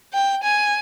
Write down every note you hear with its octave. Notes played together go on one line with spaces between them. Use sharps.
G5
G#5